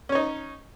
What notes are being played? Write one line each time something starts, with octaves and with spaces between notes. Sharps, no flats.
C#4 D#4 C#5